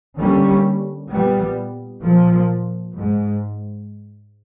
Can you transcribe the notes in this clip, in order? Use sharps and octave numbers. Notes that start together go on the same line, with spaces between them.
D3 G3 A#3 C#4
A#2 G3 B3
A#2 F3 A#3
G#2